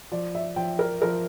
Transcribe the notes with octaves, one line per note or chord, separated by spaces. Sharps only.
F3 D5
E5
F3 G5
A#4
F3 A#4